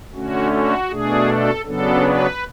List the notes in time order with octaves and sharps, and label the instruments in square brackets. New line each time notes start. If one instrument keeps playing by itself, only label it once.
[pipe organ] D3 A3 C#4 F#4
F#4
B2 A3 D4 G#4
A4
C#3 F#3 B3 D4 A4
B4